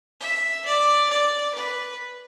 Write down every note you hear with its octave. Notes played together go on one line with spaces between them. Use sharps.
E5
D5
D5
B4